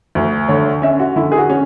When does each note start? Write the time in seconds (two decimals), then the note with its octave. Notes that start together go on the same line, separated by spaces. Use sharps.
0.15 D2
0.48 D3 C#5
0.82 C#4 E5
0.99 F#4
1.16 D3 E4
1.32 G#4
1.38 F#4
1.50 C#4